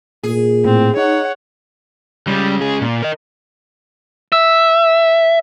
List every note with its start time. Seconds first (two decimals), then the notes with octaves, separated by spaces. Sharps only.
0.23 A#2 G#4
0.65 A2 C4
0.97 D#4 C#5 F#5
2.27 C#2 C#3 G3
2.61 G#4
2.82 A#2
3.02 A#4 D#5
4.32 E5